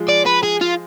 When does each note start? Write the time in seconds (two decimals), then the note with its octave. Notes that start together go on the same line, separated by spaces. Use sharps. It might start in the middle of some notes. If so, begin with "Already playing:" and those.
Already playing: F3 G#3
0.09 D5
0.27 B4
0.43 G#4
0.61 F4